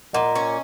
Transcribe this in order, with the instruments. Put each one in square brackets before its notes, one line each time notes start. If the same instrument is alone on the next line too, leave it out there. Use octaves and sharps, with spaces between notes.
[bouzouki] A#2 [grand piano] D#5 F#5
[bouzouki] C#4